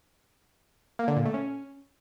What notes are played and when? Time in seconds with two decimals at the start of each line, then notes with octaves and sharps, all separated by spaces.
0.99 A#3
1.08 D3
1.17 A#2
1.25 A3
1.34 C#4